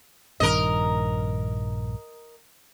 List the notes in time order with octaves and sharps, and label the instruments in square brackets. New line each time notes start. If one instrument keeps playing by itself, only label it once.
[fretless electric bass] A#1 G2 D#3 [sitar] A#4 D#5